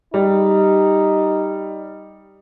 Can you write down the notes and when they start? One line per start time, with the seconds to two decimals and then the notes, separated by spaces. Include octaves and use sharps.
0.14 G3 D#4